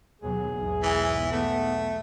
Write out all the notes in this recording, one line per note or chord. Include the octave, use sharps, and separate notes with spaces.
D#2 B2 F#3 G#4
B1 E2 G#2
E3
A3 B3